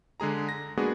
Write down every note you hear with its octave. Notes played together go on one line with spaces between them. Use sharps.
D3 G#3 G#4 A#5
A#6
G#3 A#3 B3 D4 F#4 G#4